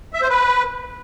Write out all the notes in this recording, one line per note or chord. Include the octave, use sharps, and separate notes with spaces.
E5
C5
B4